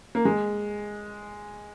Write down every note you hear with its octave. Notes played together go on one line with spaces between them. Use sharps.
A#3
G#3